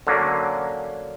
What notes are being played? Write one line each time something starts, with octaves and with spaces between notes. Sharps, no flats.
D3 F#3 A#3 C#4